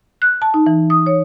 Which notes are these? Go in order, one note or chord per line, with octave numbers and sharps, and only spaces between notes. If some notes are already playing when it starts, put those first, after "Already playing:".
F#6
A5
D#4
E3
D#6
C#5